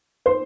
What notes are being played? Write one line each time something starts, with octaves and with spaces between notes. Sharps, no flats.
C5 C6